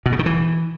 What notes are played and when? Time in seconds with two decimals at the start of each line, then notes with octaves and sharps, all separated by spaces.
0.06 B2
0.12 C#3
0.19 D#3
0.26 E3